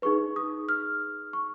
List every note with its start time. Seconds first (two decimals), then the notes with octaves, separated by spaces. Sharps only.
0.02 D#4 G#4 B4 C#6
0.36 D#6
0.69 F6
1.33 C#6